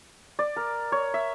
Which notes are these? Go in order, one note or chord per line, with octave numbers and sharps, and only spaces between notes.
D5
A#4
C#5
E5